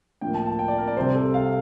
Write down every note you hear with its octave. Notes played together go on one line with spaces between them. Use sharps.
A2 F3 A#3 G5
A5
A5
G5
D5
A#4
D5
C2 C3 G3 C5
A4
F5